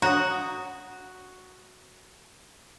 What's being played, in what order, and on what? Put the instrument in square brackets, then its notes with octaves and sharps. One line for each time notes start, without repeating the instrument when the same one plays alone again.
[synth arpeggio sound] D4 C#5 F#5 [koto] F#4 [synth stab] A#5 D#6